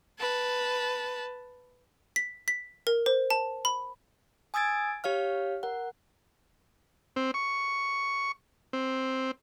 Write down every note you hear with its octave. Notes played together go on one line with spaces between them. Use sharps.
B4 A5
B6
B6
A#4
C5
A5
B5
G#5 D#6 E6 G#6 A6 D7
G4 C#5 F5 F6
A#4 F#5
C4
C#6
C4